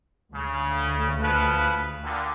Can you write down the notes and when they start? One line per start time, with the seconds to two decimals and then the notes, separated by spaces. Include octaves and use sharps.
0.34 D2 C#3
1.21 C#3 F3 B4
2.03 G2 A#2 D3